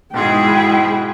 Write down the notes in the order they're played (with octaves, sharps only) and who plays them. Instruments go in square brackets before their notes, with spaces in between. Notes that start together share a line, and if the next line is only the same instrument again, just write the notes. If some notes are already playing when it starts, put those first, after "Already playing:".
[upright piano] B1 G#2 [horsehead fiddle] G#3 G5 [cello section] E4 G#4